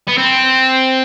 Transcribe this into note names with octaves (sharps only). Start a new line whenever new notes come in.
B3
C4